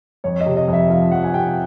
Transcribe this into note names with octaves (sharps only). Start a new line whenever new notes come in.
F2 C#5
D#5
C3
D#5
F2
E5
F3 F5
F2 F#5
G#5
C3 G5